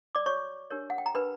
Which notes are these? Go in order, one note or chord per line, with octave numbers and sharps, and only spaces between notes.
D5 D6
F#4 C#5 C#6
D4 G4 A#4 C#5
F#5
G5
A#5
D4 G4 A#4 B4 B5